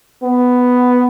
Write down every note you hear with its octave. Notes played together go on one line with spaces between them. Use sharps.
B3